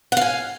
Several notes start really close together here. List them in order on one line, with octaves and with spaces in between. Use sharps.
F#5 F5 G#5